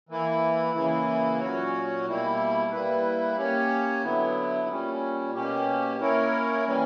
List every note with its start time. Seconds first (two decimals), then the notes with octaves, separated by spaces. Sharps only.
0.09 E3 A#3 E4
0.74 C#3 E3 A#3 E4
1.40 A#2 F#3 C#4 F#4 C#5
2.06 B2 G3 A#3 E4
2.71 G3 A#3 E4 B4
3.37 A#3 C#4 G4 C#5
4.02 D3 F#3 B3 E4
4.68 A#2 G3 C#4
5.34 B2 A#3 C#4 G4
5.99 A#3 C#4 E4 A#4 C#5
6.65 E3 G3 A#3 C#4